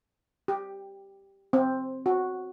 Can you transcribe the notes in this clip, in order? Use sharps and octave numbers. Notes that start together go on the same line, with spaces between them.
G4
C4
F#4